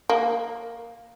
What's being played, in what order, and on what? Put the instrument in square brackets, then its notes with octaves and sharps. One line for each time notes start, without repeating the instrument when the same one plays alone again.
[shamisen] A#3